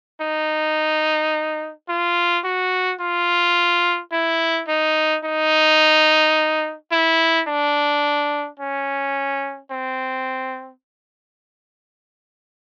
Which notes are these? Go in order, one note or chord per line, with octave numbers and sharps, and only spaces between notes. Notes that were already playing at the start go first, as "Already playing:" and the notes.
D#4
F4
F#4
F4
E4
D#4
D#4
E4
D4
C#4
C4